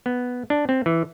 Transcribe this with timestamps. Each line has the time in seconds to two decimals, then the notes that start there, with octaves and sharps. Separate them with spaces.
0.06 B3
0.50 D4
0.69 C4
0.86 E3